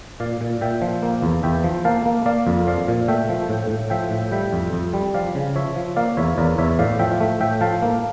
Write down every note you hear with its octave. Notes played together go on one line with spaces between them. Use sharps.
A#2 D5 F5
A#2
A#2 E5 G5
F3
A#3
E2
E2 E5 G5
F3
A#3 F5 A5
A#3
A#3 D5 F5
F2
F3 D5 F5
A#2
A3 E5 G5
F3
A2
A2
F3 E5 G5
A2
G3 E5 G5
F2
F2
G3
F3 D5 F5
C#3
F3 C#5 E5
F3
A#3 D5 F5
E2 C#5 E5
E2 A#4 D5
E2 C#5 E5
A2 D5 F5
F3 E5 G5
A3
A2 E5 G5
F3 F5 A5
A#3